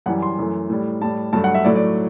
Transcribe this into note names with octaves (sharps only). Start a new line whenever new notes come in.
F#2 E3 G3 F#5
C6
F#2 E3 A3
A2 G3
A2 G3 A5
G2 F#3 A3 A5
F#5
E5
A2 F#3 A3 D5
D5